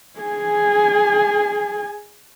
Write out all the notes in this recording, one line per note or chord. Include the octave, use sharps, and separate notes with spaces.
G#4 G#5